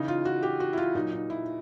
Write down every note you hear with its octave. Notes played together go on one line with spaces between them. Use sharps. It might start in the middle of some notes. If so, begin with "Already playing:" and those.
Already playing: C#3 E3 D#4
F4
F#4
G4
F#4
E4
F4
A#2 F#3 D#4
D#4
E4